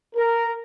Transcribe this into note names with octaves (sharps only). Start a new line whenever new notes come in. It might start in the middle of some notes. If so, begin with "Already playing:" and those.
A#4